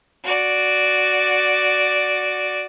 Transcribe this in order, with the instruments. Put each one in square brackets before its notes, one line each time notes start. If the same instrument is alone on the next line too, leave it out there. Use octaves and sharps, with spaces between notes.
[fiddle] F#4 D5